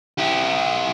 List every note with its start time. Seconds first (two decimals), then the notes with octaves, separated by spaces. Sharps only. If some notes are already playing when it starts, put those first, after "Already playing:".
0.18 E4 G4